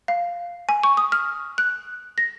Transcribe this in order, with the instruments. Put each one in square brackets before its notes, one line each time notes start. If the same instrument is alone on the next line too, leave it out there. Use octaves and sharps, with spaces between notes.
[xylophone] F5
G#5
C#6
D#6
F6
F#6
A#6